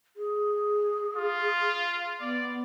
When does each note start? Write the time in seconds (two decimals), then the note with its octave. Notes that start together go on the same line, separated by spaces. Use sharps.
0.17 G#4
1.17 F4
2.21 B3 D5